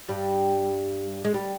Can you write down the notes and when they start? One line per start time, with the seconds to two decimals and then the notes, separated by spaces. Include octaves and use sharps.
0.08 G2 G3
1.25 G#3
1.34 G3